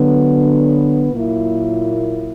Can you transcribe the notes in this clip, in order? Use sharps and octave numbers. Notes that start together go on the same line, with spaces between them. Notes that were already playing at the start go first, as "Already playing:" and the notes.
Already playing: D3 F#3 B3
A#2 F#3 A#3 E4